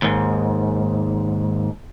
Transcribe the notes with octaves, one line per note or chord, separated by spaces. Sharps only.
D#2 G#2